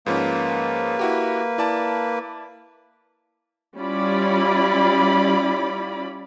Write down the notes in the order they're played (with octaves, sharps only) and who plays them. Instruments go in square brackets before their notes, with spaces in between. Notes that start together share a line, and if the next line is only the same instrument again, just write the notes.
[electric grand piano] G#2 F3 C#4 [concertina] A#3 B4
[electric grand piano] E4 F#4 G4
E4 D5 A5
[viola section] G3 C#4 E4 F4 D5 B5